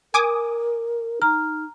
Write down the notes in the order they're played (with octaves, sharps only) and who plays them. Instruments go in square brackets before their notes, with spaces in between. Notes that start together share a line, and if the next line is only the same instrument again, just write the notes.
[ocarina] A#4 [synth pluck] G#5 D6 D#6
[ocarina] D#4 [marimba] A#5 [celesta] F6